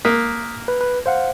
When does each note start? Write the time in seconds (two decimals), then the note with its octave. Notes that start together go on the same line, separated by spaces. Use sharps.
0.05 A#3 D#6 F#6 B6
0.68 B4
0.81 B4
1.06 C5 F5 F#5